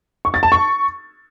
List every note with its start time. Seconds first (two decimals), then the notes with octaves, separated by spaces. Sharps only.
0.25 C#6
0.34 A6
0.43 A5
0.52 C#6